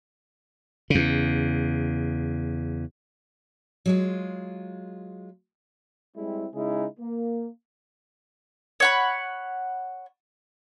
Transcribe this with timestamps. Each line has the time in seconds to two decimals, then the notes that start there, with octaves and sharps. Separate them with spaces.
0.90 E2 C#3
3.86 F#3 G#3 F4
6.16 G3 G#3 C4 E4
6.53 C#3 G#3 D#4 E4 G#4
6.99 A#3
8.80 C#5 F#5 B5